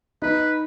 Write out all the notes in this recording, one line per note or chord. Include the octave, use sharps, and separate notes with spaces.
D#4 B4